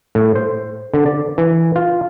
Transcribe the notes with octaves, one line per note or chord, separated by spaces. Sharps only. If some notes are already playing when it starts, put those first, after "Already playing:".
A2
C5
D3
D5
E3
F4